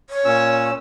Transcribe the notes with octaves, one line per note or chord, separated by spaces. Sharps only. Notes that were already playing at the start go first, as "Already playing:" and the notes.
C#5
A#2 C#4 E6